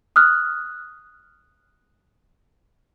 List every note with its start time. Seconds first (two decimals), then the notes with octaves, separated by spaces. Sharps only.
0.16 D#6 F6 F#6